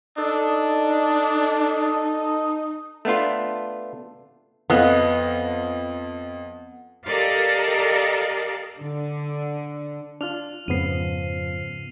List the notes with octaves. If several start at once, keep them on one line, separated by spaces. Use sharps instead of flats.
D4 D#4 A4 D#6
A3 B3 D4 F4
F2 B3 D#5 F5
G4 A4 A#4 D5 D#5 F5
D3
D4 F4 F6 F7
F2 G#2 C#3 F3 B3 C7 D#7